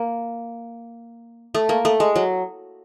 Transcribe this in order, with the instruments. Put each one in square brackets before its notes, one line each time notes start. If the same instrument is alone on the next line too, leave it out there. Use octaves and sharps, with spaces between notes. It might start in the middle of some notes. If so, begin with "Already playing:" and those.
Already playing: [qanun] A#3
A3
A#3
A3
G#3
F#3